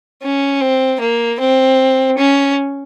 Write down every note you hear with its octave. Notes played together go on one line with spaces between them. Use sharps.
C#4
C4
A#3
C4
C#4